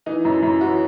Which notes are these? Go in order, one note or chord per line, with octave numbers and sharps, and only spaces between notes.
E3 D#4
F#2 E4
F#2 E4
E3 F#4